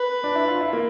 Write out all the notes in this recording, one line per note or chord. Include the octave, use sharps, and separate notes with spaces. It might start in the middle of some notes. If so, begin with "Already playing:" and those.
Already playing: B4
D4
E4
F4
E4
A#3